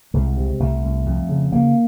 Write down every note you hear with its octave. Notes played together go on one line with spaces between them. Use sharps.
C2 G#3
C3
C2 A3
C2
F2
C#3
C#3 A#3